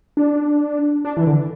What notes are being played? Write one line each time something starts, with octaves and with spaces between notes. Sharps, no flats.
D4
D4
E3
D3